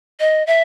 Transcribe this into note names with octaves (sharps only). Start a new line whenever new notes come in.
D#5
E5